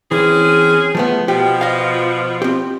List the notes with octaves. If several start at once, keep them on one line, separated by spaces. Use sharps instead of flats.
E3 C4 C#4 G#4
F3 A3 B3
B2 F3 G4
D#5 F5
C4 G4